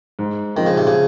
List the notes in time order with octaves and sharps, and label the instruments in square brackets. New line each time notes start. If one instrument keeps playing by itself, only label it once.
[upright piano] G#2
[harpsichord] D#3 [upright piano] F3 G#3 C4
[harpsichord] C#3
C3
C#3